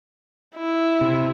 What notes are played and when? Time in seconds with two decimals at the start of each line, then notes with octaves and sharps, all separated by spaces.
0.56 E4
1.01 C3